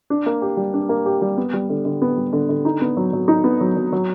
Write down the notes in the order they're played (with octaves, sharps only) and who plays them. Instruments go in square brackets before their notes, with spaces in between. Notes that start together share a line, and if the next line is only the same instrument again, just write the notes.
[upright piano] D4
A#3
G4
G3
D4
A#3
G4
G3
B3
G3
D3
D3
B3
G3
D3
D3
D#4
B3
F#3
F#3
D#4
B3
F#3
F#3
F#3